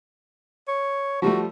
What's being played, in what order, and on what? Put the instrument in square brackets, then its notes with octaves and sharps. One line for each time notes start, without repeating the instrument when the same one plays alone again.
[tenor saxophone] C#5
[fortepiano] F3 G3 A3 [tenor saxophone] F#4